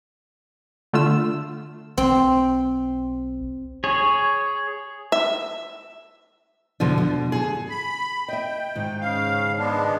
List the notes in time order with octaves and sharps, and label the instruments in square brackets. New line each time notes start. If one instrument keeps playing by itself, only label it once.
[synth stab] D3 A3 F4 E6
[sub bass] B1 [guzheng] C4
[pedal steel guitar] G#4 C#5
[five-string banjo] E5
[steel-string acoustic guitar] E2 B2 D3 F3
B2 D3
G#4 A4
[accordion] B5
[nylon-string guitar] D#5 E5 [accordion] G5
[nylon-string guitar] G#2 D#3
[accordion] C#3 F5
G#3 B3 D4